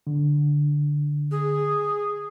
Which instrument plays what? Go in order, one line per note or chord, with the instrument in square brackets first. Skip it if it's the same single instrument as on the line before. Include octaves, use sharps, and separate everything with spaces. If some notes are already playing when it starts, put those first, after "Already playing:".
[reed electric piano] D3
[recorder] G#4